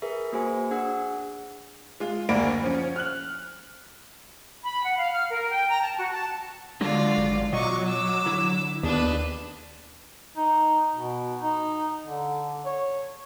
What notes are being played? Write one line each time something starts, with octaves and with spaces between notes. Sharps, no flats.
G#4 A#4 B4 E5
A#3 F#4 G#4 C5 G#5
D4 G#4 F#5 E6
G#3 F4
F#1 D2 A#3 D4 B5 D7
F3 C#4
F6 F#6 F#7
B5
F#5
F5
F6
A#4
G5
A#5
A5
F#4
A5
D3 F#3 G#3 F4 F#4 D5
G#1
B2 F#3 F4 D#5 C#6 D6
D6 E6
D3 E4
D#2 B3 D4 G#4 B4
D#4
B2
D#4
D3
C#5